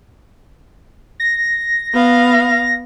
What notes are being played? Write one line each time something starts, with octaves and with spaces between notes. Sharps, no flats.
A#6
B3 F5